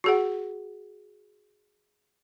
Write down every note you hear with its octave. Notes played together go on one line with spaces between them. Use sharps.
F#4 G#4 F#5